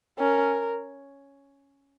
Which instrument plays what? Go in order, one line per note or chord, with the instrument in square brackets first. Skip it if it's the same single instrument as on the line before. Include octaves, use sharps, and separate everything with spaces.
[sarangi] C#4 [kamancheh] A#4